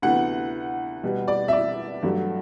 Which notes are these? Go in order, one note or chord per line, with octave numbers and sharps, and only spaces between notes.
D2 C3 E3 B3 F#5
B2 G3 B3
D5
E5
D5
G2 F#3 A3